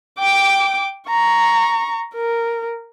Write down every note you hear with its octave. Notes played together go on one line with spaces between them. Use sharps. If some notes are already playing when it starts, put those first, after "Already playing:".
G5 D6
A#5 C#6
A#4